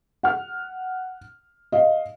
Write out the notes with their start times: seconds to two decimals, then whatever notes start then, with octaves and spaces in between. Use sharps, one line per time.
0.23 F#5 F6
1.72 D#5 F5